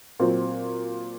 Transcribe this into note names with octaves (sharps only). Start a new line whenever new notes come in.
A#2 F#3 C4